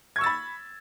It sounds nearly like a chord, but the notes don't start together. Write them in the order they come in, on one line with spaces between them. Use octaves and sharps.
G#6 C#6 E6 A6 B5